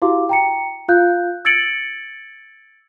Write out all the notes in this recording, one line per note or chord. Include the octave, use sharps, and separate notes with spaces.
E4 F#4 G4 F5 D6
G5 A#5 C#7
F4 F5 F#6 G6
E6 G#6 A6 C#7 D7 F#7